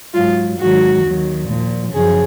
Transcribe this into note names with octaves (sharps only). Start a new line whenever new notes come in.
G#2 F#3 F4
G#2 D#3 F#3 F#4
D#2 D#3 F#3
A#2 F3
F#2 C#3 F3 G#4